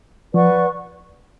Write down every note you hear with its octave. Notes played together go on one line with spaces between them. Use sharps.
F3 B4 D5 F#5 C#6